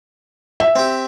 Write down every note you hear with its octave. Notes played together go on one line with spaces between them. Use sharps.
E5
C4 G4